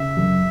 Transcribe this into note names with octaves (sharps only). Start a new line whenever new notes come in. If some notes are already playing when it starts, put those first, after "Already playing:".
Already playing: C#3 E5
F#2